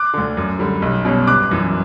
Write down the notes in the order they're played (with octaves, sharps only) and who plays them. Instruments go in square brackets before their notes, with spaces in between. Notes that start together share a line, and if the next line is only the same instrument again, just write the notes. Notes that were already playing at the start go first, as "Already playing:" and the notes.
Already playing: [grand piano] D6 F#6
D2 D3
F#2
D3 G3
B1
B2 G3 C#4
G1 D6 F#6
F#2 E3